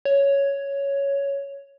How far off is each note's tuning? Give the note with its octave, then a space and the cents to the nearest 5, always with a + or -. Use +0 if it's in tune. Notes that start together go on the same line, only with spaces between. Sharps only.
C#5 +5